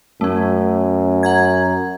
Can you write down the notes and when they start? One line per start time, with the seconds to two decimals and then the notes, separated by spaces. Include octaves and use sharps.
0.21 F#2 A3 C#4
1.23 F#5 A#5 G#6